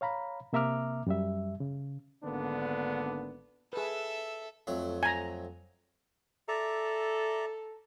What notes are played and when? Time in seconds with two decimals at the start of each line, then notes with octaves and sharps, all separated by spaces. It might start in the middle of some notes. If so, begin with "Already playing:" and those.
0.01 C#5 F5 A#5 B5
0.53 C3 A#3 E5 A#5 D6 F6
1.07 F#2 G3 E5
1.60 C#3
2.24 G#1 D3 A#3 B3 D4
3.73 G#4 A4 B4 E5
4.67 F2 F#3 A3
5.03 G#5 A#5
6.48 A4 D5 E5 A#5